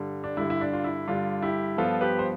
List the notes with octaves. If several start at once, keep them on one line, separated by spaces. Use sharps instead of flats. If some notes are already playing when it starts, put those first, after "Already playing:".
Already playing: G2 D3 G3
D4
G2 D3 G3 E4
E4
D4
F4
E4
G2 D3 G3 D4 F4
E4 G4
G2 F3 B3 F4 A4
G4 B4
C5